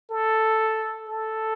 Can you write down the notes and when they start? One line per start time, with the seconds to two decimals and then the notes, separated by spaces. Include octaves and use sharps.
0.10 A4
1.08 A4